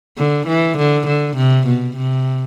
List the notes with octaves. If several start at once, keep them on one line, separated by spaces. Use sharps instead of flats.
D3
E3
D3
D3
C3
B2
C3